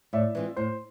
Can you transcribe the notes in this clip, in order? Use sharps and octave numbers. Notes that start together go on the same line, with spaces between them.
A2 D5 E5
E3 G#3 C4 F4
A2 C5